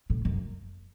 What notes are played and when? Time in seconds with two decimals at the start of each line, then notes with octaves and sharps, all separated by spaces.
0.10 A2
0.25 F#2